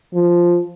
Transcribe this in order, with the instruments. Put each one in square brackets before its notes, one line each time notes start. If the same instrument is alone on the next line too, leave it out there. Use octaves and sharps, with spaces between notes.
[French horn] F3